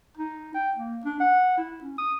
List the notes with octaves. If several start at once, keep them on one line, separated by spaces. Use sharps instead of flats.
D#4
G5
A#3
D4
F#5
E4
C#4
D#6